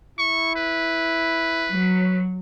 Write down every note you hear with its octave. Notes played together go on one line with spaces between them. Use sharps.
E4 C#6
B4
F#3